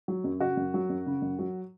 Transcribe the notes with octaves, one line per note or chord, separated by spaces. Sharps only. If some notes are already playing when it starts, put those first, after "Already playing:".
F#3
F#2
C#3 F#4
F#2
F#3
F#2
C#3
F#2
F#3